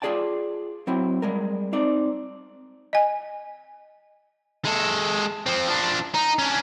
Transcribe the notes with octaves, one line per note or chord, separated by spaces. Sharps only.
F4 G4 G#4 D5 G5 A5
F#3 C4 E4
G3 G#3 A#4
C4 D#4 D5
D#5 G#5
G#3 A4
F3 C4
F3 D4
D#4
C#4 D4